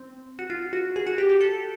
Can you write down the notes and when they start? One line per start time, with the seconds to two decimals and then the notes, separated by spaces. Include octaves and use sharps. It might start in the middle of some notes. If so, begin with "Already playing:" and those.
Already playing: C4
0.39 F#4
0.50 F4
0.73 F#4
0.96 G#4
1.07 F#4
1.18 G4
1.30 G4
1.41 A4